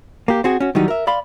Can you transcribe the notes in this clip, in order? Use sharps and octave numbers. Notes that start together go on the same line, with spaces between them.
A#3 G4
C4 F#4 G#4
C#4 F#4
D#3 E3 F#3 G3 D#4
A#4 E5
D5 F5 B5 C6